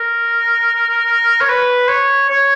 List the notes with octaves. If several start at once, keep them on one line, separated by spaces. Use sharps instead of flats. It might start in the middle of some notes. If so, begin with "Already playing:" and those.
Already playing: A#4
C#5
B4
C#5
C#5